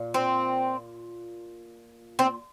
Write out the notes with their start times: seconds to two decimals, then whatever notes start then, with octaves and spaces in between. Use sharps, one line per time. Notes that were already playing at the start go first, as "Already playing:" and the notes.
Already playing: A#2
0.14 C4
2.19 C4